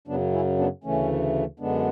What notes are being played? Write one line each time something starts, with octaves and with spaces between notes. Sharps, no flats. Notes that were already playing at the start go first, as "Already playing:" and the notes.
F#2 C#3 F#3 B3 D4
C#4 E4
B3 D4
D2 C#3 E3 A3 C#4
F#2 D3 G#3 B3 D4